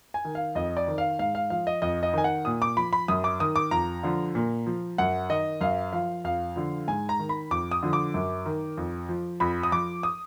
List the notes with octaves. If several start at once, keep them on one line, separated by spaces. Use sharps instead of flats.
G#5
D#3
F5
F2 D#5
D5
D#3
F5
G#2 F5
F5
F3 F5
D#5
F2 D#5
D#5
D#3 G#5
F#5
A#2 D#6
D6
F3 B5
B5
F#2 D#6
D6
D#3 D#6
D6
F2 A#5
D3 F3
A#2
F3
F#2 F#5
D#3 D#5
F#2 F5
F3 F5
F2 F5
D3 F3
G#2 G#5
A#5
D#3
B5
F2 D6
D#6
D3 F3
D6
F#2
D#3
F2
F3
F2 B5
D#6
F3 D6
D#6